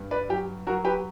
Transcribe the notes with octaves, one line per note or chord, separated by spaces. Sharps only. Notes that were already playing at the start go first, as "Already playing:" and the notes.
Already playing: G2
B4 D5
F#3 G4
F#3 F#4 A#4
G4 B4